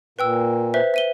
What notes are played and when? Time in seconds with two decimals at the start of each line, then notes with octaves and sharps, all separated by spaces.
0.19 A#2 B4 G5 E6
0.74 B4 C5 E5
0.94 E5 D#7 G7